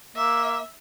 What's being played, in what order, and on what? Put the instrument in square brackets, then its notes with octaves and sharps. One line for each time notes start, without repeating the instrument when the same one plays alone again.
[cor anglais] A#3 [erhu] E5